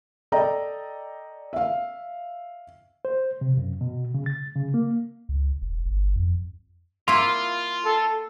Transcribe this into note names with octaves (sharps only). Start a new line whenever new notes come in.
A4 D5 D#5 G5 A#5
E5 F5
C5
C3
F#2
B2
C#3
A6
C#3
A#3
C#2
E1
G1
F2
A#3 E4 F4 C6
A4